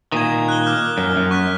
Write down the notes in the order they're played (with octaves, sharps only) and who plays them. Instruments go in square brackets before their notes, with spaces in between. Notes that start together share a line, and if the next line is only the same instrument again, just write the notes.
[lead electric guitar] A#2 D#3 [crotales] D#6 G#6
[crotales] F#6 G7
D6 F6 G6
[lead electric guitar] F#2
F#2
[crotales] C#6 F#6 B6